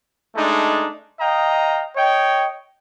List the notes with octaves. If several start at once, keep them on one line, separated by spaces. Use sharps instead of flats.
G#3 A3 D4 D#4
D#5 F5 G5 A#5
C#5 D#5 G5